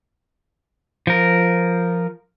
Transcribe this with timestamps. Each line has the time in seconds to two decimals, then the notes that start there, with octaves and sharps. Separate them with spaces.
1.07 F3 A#4